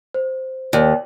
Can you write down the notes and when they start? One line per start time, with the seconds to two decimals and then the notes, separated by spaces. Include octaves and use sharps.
0.14 C5
0.73 D#2 D5 G5